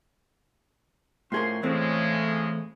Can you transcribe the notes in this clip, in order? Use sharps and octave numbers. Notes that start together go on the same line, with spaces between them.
A2 F3 C#4 G#4 A#4 C6
A2 C#3 E3 G#3 A3 C4